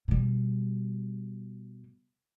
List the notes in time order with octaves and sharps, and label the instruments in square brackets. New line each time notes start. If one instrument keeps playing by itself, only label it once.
[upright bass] B2 G3